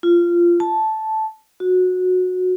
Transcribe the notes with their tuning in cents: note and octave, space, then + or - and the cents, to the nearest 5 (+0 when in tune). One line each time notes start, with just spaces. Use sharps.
F4 -15
A5 -10
F#4 -15